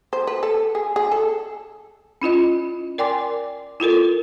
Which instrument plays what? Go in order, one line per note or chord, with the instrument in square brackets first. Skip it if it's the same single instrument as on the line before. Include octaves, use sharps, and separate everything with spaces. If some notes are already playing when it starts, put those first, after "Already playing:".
[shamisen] C5
B4
A4
G#4
G#4
A4
[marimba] C#4 E4 F4 D#5
A#4 D5 G5 G#5 C6 D6
E4 F4 A4 A#4